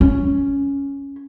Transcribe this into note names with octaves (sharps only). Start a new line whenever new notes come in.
C#4